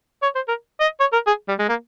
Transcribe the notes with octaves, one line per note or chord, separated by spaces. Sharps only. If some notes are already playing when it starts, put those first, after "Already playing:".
C#5
C5
A#4
D#5
C#5
A#4
G#4
G3
G#3
A#3